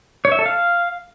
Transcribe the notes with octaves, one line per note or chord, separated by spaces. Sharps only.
C#5
E5
A4
F5